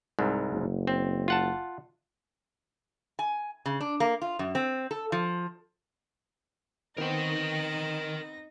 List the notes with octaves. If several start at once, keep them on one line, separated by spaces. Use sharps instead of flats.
C2 G#2
F#1
C4
F4 F#5 A5
G#5
C#3
D4
A#3
F4
F#2
C4
A4
F3
D#3 B3 C4 D#4 A#4 C5 G5 A#6